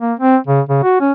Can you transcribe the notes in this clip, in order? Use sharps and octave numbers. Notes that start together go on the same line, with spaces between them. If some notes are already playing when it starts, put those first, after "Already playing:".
A#3
C4
C#3
C#3
F#4
C#4